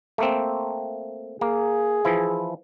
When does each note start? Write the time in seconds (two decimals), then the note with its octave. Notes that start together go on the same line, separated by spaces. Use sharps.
0.18 A3 A#3 C4
1.41 A#3 G#4
2.05 E3 F3 E4